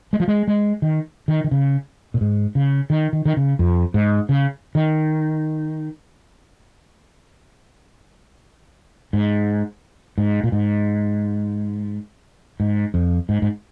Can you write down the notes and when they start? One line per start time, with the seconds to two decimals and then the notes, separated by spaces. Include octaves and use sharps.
0.13 G#3
0.20 F3
0.28 G#3
0.48 G#3
0.82 D#3
1.28 D#3
1.44 D#3
1.51 C#3
2.14 A#2
2.21 G#2
2.55 C#3
2.90 D#3
3.13 D#3
3.25 D#3
3.37 C#3
3.59 F2
3.94 G#2
4.29 C#3
4.75 D#3
9.13 G#2
10.18 G#2
10.44 A#2
10.52 G#2
12.60 G#2
12.94 F2
13.29 G#2
13.42 G#2